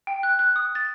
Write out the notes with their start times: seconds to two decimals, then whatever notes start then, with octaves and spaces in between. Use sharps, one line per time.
0.07 G5
0.23 F#6
0.39 F#6
0.56 D#6
0.75 A6